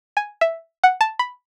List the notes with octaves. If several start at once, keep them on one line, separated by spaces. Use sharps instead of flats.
G#5
E5
F#5
A5
B5